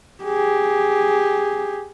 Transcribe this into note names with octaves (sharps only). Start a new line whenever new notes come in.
G4 G#4